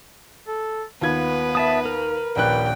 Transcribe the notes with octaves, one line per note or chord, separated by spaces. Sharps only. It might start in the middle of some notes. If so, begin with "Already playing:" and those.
A4
D#2 B3 F4 B4 G#6
E5 A5 D#6
A#4
D#1 A#1 B4 G5 F#6